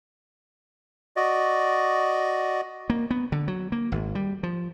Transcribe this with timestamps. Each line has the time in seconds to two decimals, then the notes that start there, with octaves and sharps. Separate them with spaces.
1.17 F#4 D5 D#5
2.90 A#3
3.11 B3
3.32 D3
3.48 F#3
3.72 A#3
3.92 G#1
4.15 G3
4.43 F3